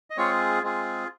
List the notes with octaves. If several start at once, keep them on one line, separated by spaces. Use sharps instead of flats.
D#5
G#3 C4 F4 G#4 C#5
G#3 C4 F4 G#4